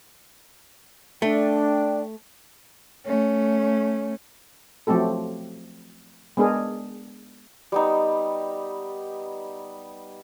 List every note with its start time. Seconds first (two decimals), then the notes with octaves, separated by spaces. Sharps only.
1.22 A3 D4 D5 G5
3.05 A3 C#4
4.87 F3 F#3 A3 C4 G4 A4
6.37 G#3 B3 D4 G#4 A#4
7.72 G3 B3 D#4